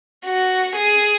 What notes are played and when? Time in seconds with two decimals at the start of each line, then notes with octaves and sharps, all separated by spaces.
0.25 F#4
0.76 G#4